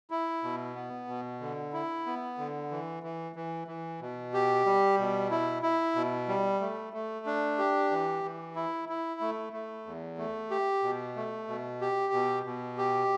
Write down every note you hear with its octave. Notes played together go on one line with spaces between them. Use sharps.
E4
B2
B3
B2
D3
E4
B3
D3
E3
E3
E3
E3
B2
G4
G3
B2
E4
E4
B2
G3
A3
A3
D4
G4
E3
E3
E4
E4
A3
A3
E2
A3
G4
B2
A3
B2
G4
B2
B2
G4